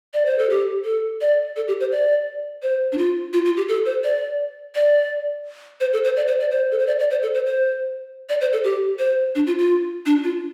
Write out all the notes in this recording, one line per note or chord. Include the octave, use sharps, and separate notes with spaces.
D5
C5
A4
G4
A4
D5
A4
G4
C5
D5
C5
D4
F4
F4
F4
G4
A4
C5
D5
D5
C5
A4
C5
D5
C5
D5
C5
A4
C5
D5
D5
C5
A4
C5
C5
D5
C5
A4
G4
C5
D4
F4
F4
D4
F4